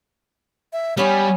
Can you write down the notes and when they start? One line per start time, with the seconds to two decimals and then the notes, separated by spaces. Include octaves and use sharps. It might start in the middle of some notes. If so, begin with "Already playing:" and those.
0.73 E5
0.97 G3 B3 C#4 C#5